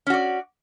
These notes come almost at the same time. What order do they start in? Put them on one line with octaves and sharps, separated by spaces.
C#4 F#4 D5